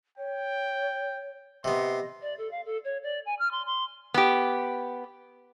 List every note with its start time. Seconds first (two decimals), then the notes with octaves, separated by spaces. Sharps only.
0.18 C#5 G5
1.64 C3 B3 D#5 C6
2.21 D5
2.38 A4
2.51 F5
2.65 A4
2.84 C#5
3.03 D5
3.25 G#5
3.39 F6
3.51 C6
3.65 C6
4.14 B3 G4